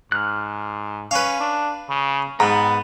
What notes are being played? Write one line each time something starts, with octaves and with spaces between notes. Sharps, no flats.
G#2 F6 F#6
C#4 B4 F5
D4
C#3
G#2 B3 B4 G5 A#5